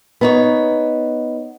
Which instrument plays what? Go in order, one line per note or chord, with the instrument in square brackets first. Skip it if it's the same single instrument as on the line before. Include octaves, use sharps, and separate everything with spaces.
[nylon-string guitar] B3 D#4 C#5